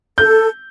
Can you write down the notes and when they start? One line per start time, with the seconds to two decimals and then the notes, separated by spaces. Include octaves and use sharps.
0.18 A4 G6